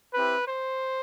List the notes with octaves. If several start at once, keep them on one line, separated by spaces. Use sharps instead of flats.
C4 E4 G4 B4
C5